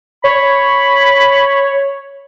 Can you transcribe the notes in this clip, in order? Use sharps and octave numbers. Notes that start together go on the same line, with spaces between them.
C#5 B5